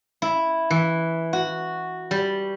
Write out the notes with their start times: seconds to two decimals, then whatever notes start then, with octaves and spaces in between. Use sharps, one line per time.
0.22 E4
0.71 E3
1.33 F#4
2.11 G3